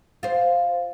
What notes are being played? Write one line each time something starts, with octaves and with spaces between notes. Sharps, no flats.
F4 C5